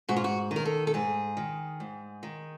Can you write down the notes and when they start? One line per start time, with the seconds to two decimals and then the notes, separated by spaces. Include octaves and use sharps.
0.09 G#2 F#4
0.16 F4
0.24 F#4
0.51 D#3
0.56 A#4
0.65 A4
0.87 A4
0.94 G#2 G#4
1.37 D#3
1.80 G#2
2.23 D#3